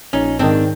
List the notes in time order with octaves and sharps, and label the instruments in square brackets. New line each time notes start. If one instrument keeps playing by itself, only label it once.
[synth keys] A#1 [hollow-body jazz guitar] C#4 D#4
[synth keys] G#2 D#3 [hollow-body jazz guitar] C4 D4